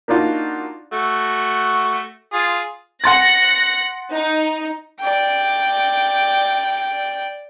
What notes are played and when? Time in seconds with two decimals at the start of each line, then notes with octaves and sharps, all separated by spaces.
0.08 A#3 D4 D#4 F4 F#4
0.93 A3 F#4
2.33 F4 G#4
3.04 F#5 C6 F#6 A6 A#6 C#7
4.12 D#4
5.00 D5 G5